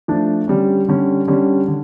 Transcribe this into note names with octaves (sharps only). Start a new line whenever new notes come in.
F3 A3 D4
D3 G3 C#4
D3 G3 C#4
D3 G3 C#4
D3